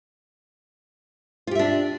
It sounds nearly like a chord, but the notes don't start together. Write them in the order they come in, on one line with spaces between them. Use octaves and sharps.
F4 G4 E5 D4